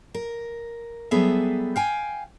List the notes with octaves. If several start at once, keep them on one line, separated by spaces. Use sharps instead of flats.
A#4
F#3 G3 B3 G#4 A4 E5
F5 G5 G#5